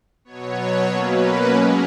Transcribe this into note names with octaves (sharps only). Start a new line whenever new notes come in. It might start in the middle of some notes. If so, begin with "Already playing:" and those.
B2 F#3 B3 C#5
C#5
B2 F#3 A#3 C#4 B4
B2 G#3 C#4 A#4